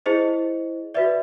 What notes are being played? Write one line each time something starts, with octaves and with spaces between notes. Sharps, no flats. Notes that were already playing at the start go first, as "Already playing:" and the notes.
E4 G#4 C5 D#5
F#4 B4 D5 E5